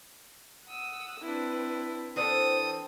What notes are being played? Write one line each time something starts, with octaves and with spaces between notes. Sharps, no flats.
F#5 D#6 E6
C4 D4 E4 B4
E3 C4 D4 A4 C5 G5 D#6